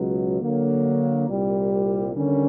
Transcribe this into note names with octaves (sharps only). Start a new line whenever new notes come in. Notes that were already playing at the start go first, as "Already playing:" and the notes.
Already playing: C#2 B2 F#3
D3 F#3 A#3
C2 A#2 G3
D#2 D3 G3 A#3 C#4